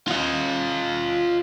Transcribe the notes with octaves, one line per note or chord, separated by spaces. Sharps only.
F4 D#5